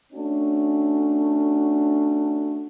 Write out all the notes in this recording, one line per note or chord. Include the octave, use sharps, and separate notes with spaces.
A3 C#4 D4 F#4